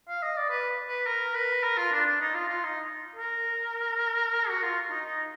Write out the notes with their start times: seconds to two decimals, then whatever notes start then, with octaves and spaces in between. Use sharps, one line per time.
0.09 F5
0.23 D#5
0.37 D5
0.50 B4
0.89 B4
1.07 A#4
1.36 B4
1.63 A#4
1.78 F4
1.92 D4
2.06 D4
2.20 D#4
2.35 F4
2.49 F4
2.64 D#4
3.16 A#4
4.49 F#4
4.62 F4
4.91 D#4
5.05 D#4